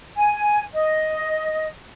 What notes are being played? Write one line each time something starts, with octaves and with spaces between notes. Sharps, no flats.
G#5
D#5